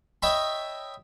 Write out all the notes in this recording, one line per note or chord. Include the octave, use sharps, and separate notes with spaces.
C#5 D#5 E5 G5 A5 B5